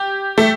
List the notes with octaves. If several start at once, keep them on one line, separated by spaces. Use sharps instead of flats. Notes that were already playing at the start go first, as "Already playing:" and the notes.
Already playing: G4
A3